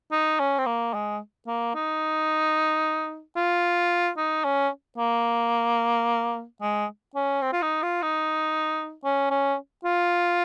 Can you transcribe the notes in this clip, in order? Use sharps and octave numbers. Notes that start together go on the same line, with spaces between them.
D#4
C#4
C4
A#3
G#3
A#3
D#4
F4
D#4
C#4
A#3
G#3
C#4
C4
F4
D#4
F4
D#4
C#4
C#4
F4